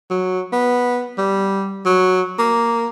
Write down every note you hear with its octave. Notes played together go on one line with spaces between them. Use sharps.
F#3
B3
G3
F#3
A#3